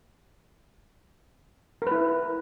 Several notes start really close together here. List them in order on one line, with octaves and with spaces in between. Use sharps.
A#4 B4 E4